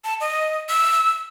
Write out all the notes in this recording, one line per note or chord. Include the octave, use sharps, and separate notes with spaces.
A5
D#5
E6